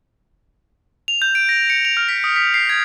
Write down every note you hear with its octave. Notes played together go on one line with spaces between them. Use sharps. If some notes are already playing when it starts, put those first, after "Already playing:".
F7
G6
D7
A#6
C#7
F7
F6
B6
D#6
B6
C7
G#6